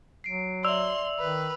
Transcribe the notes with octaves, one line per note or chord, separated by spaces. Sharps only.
F#3 C7 D7
D5 E5 C6 E6 F7
D#3 B4